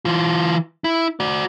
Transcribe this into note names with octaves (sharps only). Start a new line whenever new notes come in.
E3 F4
E4
F#4 D5